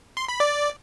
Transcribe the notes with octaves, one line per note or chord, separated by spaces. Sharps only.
C6
B5
D5